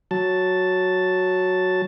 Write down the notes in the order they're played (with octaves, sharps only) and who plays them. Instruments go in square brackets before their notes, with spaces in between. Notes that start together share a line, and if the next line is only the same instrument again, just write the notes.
[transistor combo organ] F#3 A5